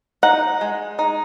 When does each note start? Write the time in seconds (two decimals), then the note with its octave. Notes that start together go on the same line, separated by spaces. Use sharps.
0.23 D#4 F#5
0.61 G#3
0.99 D#4